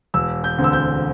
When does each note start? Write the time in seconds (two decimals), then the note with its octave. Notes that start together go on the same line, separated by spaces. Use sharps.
0.14 E1 E6
0.44 G6
0.58 D2 D3 C4
0.64 E6
0.73 G6